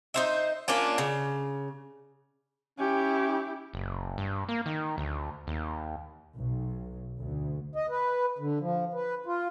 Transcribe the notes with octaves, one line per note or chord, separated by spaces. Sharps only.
D#4 C5 E5
A#3 C#4 D4 F4
C#3
C#4 E4 G4
F#1
G2
A#3
D#3
D2
D#2
B1
D2
D#5
B4
D3
F3
B4
F4